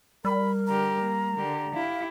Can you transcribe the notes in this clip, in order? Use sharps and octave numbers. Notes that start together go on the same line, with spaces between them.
G3 A#4 B5
D3 G4 A#5
A#3
D3 G4
E4 G4 F5